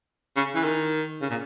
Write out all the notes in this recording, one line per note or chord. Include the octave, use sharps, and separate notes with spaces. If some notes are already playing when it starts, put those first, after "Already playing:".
C#3
E3
D#3
C#3
A#2